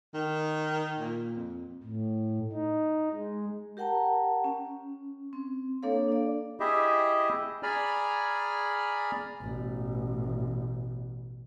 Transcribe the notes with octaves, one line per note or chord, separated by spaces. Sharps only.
D#3
A#2
F2
A2
D#4
G#3
G4 A#4 F#5 G5 A5 A#5
C#4
C4
A#3 D4 A4 C#5 F5
D4 D5
E4 G4 G#4 D#5 E5
G#4 D5 G#5 A#5 B5 F6
A1 B2